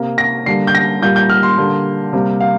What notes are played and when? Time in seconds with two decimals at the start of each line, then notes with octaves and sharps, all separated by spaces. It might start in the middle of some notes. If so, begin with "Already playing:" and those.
Already playing: C3 A#3
0.18 A#6
0.46 D3 G3 A#3 C7
0.67 G6
0.75 A#6
1.02 A#2 G3 A#3 G6
1.16 G6
1.30 F6
1.43 C6
1.57 D3 G3 A#3
2.13 C3 G3 A#3
2.41 F5